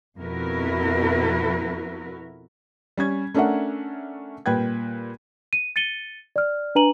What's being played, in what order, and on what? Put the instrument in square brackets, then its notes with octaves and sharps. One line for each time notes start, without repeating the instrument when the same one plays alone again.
[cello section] F2 B2 E4 F#4 A#4 B4
[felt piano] G3 C#4 G#6
A3 C#4 D4 A#4 E5 F#5
A#2 G3 B4 G5 G#6
[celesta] D#7
A6 C#7 D#7 G7
D5 F6
D4 B4 G#5 A#5 D#7 F#7